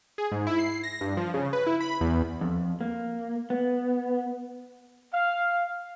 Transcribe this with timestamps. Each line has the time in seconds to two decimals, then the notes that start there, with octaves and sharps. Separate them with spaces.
0.18 G#4
0.32 G#2
0.47 E4
0.59 C7
0.83 A#6
1.01 G2
1.17 F3
1.34 C#3
1.53 B4
1.67 E4
1.80 B5
2.01 E2
2.41 F2
2.81 A#3
3.50 B3
5.13 F5